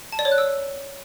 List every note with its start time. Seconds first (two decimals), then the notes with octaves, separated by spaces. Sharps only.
0.12 A5
0.19 D5
0.25 C#5
0.32 F#6
0.38 E6